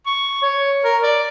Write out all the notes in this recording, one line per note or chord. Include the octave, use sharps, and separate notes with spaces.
C#6
C#5
A#4
D5